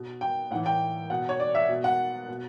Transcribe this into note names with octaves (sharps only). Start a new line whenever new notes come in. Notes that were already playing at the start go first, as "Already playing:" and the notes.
Already playing: B2
G5
A2 E3 F#5
G5
B2 F#5
C#5
D5
E5
B2
F#5
B2